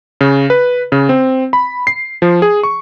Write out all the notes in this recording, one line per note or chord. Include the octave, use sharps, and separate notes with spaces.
C#3
B4
C#3
C4
B5
C7
F3
G#4
C#6